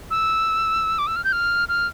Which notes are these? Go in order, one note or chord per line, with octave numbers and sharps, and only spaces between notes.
E6
D6
E6
F6
G6
F6
F6